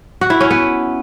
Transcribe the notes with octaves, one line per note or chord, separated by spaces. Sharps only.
F#4
E4
C#4
B3